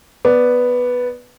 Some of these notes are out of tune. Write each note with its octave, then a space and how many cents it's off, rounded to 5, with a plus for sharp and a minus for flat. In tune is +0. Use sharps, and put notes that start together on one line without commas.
B3 +0 D5 +0